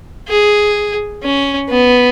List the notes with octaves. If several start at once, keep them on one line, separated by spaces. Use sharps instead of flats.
G#4
C#4
B3